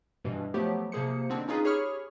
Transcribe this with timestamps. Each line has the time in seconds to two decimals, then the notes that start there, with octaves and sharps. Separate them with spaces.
0.24 G2 B2 E3
0.54 F3 F#3 A3 B3 G4
0.92 C3 F3 A#3 G#4 C5 C#7
1.29 D3 D#3 C4 D4
1.48 C#4 D#4 F4 G#4 B4
1.64 G4 G#4 C#5 B5 C#6 F6